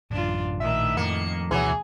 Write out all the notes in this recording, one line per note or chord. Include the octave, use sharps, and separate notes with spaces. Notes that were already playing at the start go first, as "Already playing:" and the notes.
A1 F#2 D4 F4
A#1 A2 D#3 E5
F2 F3 A#3 C#7
A1 D2 B2 E3 F#3 G#4